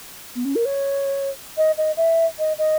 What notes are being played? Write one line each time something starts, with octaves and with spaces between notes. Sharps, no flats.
B3
C#4
A#4
C#5
D#5
D#5
E5
D#5
D#5